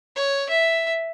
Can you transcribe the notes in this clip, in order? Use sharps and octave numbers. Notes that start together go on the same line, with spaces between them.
C#5
E5